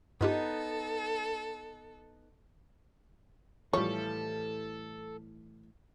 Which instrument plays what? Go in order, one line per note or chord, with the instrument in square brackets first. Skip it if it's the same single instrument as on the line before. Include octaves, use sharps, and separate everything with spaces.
[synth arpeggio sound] G2 F4 G4 [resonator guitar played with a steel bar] B3 D#4 [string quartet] A4
[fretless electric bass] A2 E3 [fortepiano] F3 G3 [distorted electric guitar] A4 [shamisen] C#5